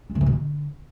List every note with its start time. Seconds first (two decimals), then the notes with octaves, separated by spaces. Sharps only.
0.10 G3
0.15 D3
0.21 E3
0.26 B2
0.32 D3